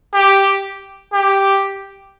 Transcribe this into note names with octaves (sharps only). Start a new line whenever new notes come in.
G4
G4